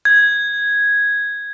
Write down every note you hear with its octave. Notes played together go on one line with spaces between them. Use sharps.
G#6